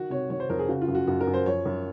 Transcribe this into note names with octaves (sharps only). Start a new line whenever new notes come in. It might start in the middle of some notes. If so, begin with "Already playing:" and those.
Already playing: D#3 F#4
C3 C#5
D#3 C#5
C5
F2 A#4
G#4
C#3 F#4
F4
F#2
F#4
F#2 F#4
A#4
F#2
C5
F3 C#5
F#2